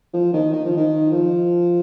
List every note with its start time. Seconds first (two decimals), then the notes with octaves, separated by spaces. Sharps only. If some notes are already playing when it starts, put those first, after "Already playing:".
0.13 F3
0.33 D#3
0.53 D#3
0.65 F3
0.76 D#3
1.11 F3